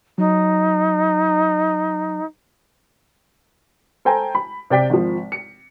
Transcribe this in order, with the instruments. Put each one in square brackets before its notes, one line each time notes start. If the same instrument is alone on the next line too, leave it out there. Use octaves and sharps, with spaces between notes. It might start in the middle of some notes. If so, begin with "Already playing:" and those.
[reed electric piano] F#3 [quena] D#4
[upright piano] A4 C5 G5 G#5 A#5
B5
C3 D5 G5 B6
G#1 F3
C#7